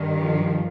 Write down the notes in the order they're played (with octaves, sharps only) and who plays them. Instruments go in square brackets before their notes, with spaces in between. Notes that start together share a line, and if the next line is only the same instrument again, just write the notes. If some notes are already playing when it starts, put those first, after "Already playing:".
Already playing: [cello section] G2 D#3
F3